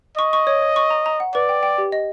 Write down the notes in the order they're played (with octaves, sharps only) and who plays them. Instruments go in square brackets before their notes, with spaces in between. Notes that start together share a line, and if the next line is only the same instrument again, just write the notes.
[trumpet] D#5 [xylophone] C#6
[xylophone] C#6
C#5
C#5
C#6
A#5
A#5
F#5
[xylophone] B4 [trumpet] D5
[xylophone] G5
G5
G4
D#5